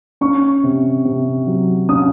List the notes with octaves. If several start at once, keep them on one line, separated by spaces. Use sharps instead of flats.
C#4 C#6
C3
C3
F#3
C#4 D#6